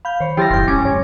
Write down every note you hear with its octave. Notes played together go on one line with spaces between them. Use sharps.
F5 B5 G6
D#3 C5 C#5
F3 E4 G4 G5 C6 A6 A#6
D#1 A1 F#2 C6 G6
F#2 G#3 C#4 D6
G#2 C#3 F#3 C#5